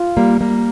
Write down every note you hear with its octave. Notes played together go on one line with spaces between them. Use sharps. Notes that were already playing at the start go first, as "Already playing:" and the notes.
Already playing: F4
G3 A#3
G3 A#3